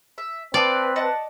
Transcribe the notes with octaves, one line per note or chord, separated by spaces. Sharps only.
E5
C4 B4 D5 F5 A5 D#6
D#5 F#5 A5